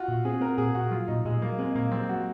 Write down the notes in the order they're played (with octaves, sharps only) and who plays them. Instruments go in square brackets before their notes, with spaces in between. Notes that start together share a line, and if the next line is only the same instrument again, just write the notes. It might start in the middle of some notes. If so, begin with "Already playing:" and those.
Already playing: [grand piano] F4 F#4
[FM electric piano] A#2
[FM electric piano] C4 [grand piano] G#4
[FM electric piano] C4 [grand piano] A#4
[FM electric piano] A#2 [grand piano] G#4
[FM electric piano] A#2 [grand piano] F#4
[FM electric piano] F#3 [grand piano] F4
[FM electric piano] A#2 [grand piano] D#4
[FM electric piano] A#2 [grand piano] G#3
[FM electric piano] F#3 [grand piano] A#3
[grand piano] G#3 [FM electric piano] C4
[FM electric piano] A#2 [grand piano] A#3
[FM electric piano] F#3 [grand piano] C4
[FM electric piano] F#3 [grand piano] F#4